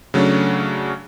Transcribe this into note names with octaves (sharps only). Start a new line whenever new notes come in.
C#3 F#3 A3 C#4 D4